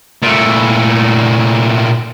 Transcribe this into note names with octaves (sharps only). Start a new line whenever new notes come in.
A#2 A3